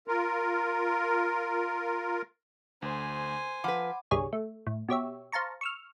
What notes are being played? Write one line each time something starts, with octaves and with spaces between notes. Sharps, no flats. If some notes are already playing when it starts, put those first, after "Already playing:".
F4 A#4
D2 C5 G#5
F3 B4 F#5 B5 D6
G1 C2 G3 G#4 C#5
A3
A2
B2 G4 C#5 E5
C5 F5 A5 A#5 C#6
C#6 E6 F6